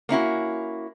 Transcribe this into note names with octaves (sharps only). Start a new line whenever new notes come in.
A#3 C#4 E4 F#4